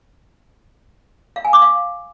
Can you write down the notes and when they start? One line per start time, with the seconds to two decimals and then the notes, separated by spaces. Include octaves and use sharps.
1.36 F5
1.45 G#5
1.53 D6
1.62 F5